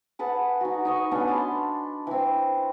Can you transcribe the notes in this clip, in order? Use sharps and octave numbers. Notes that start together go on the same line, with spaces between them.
G#4 B4 F#5 A5
D#4 F#4
D#4 D#5 C#6
B3 C#4 D4 G#4
A5 B5 C6
E3 C4